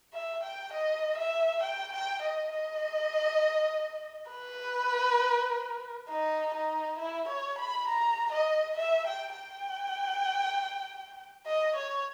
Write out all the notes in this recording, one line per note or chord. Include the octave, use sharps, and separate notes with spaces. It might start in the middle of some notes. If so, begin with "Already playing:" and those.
E5
G5
D#5
E5
G5
G5
D#5
D#5
B4
D#4
D#4
E4
C#5
B5
A#5
D#5
E5
G5
G5
D#5
C#5